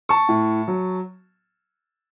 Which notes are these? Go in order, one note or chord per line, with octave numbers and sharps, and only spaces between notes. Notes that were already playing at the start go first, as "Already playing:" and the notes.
A5 C#6
A2
F#3